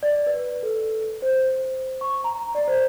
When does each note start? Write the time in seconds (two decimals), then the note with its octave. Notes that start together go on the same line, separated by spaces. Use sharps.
0.03 D5
0.27 B4
0.63 A4
1.22 C5
2.01 C#6
2.24 A#5
2.55 D5
2.67 C5